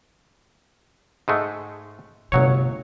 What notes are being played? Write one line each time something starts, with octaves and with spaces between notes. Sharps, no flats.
G#2 G#3 A3
G1 C3 F#3 A3 C#5